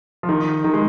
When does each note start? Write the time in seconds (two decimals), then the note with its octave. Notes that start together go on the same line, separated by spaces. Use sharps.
0.23 F3
0.29 D#3
0.64 D#3
0.74 G#3